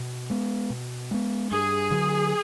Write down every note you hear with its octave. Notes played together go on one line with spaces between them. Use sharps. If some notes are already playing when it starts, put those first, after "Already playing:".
Already playing: B2
G#3 B3
B2
G#3 B3
G2 G#4
D3 F#3